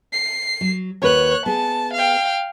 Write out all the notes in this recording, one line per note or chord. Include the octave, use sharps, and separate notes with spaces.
C7
F#3
D#2 F#4 B4 C#5 F#6
B3 G#4 A5
F5 G5